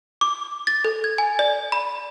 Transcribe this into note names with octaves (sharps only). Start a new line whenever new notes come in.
D6
A6
A4
G#6
G#5
D5
B5